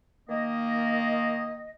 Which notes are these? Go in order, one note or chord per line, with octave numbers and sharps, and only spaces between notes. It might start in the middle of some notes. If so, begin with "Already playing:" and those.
D#3 A#3 D#5